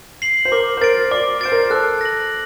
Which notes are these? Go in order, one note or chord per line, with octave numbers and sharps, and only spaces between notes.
C7 F#7
C5
A#4 D6
C5
A#4 A6 D7
D5 D6
C5 A6 D7
A#4
A4 F#6
A#6 F#7